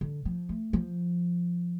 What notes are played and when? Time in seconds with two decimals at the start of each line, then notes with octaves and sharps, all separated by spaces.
0.01 D3
0.25 F3
0.49 A3
0.73 F3